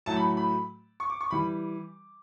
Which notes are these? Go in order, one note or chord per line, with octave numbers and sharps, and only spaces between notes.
A2 F#3 A3 A5
B5
B5
C#6
D6
C#6
E3 G3 B5